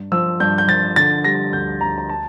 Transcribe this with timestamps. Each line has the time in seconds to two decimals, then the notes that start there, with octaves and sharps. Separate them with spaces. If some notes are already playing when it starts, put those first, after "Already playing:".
Already playing: G2
0.12 F3 E6
0.40 G2 G6
0.58 G6
0.68 F3 A6
0.96 D3 A6
1.24 G3 A#6
1.53 D2 G6
1.81 D2 A#5
1.98 A#5
2.09 A5